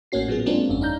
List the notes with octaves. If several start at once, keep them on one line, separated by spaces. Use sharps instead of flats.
A1 A2 A#3 C#4 F#4 C7
A#2 F#3 B3 G#4
F#3 G#3 A#3 C4 D4 F4
G1 F2 C#4
D4 D#4 F5 A#5 G6